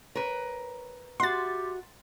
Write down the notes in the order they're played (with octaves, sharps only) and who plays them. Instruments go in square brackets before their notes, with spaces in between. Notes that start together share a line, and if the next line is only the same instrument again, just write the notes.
[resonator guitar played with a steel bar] A#4 B4 [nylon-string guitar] C#5
[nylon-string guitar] F#4 E5 F#5 [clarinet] G4 [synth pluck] C6 A6